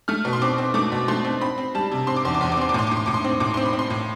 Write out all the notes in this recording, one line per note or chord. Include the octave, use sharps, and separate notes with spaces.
A3 F6
B2
C6
C4 D6
C4
A3 D6
B2
A3 C6
C4
C4 B5
C4
G3 A5
C3
C4 C6
D6
E2 C6
D6
E2 C6
D6
C4 C6
D6
A2 C6
D6
A2
C6
A2 D6
C6
C4
A2 D6
C4 C6
B5
C4
C6
A2